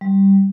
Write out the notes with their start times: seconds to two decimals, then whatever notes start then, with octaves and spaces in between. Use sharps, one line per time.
0.01 G3